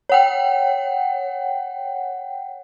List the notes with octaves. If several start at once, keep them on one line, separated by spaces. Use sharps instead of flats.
C#5 F#5 G5